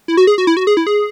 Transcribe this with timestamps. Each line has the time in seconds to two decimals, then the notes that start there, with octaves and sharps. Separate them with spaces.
0.08 E4
0.17 F#4
0.27 G#4
0.38 F#4
0.47 E4
0.57 F#4
0.67 G#4
0.77 E4
0.87 G#4